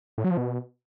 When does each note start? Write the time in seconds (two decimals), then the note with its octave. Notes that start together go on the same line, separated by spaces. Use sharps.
0.18 A2
0.24 F#3
0.31 F3
0.37 B2